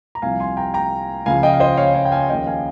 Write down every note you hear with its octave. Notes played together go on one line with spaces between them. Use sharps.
A#5
C2 C3 F3 F5 G#5
G#5 C6
G5 A#5
G5 A#5
C#2 C#3 F3 F5 G#5
D#5 G5
F5
C5 D#5
C#5 F5
C#5 F5
G5
F5 G#5
D#2 C#3 F3 D#5 G5
F5 G#5